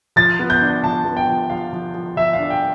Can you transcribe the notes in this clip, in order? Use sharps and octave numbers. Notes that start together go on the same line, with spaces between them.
F3 A6
B3
G6
D4
F3 A5
B3
G5
F3
F3 F5
F3
F3
F3 E5
F5
D4
G5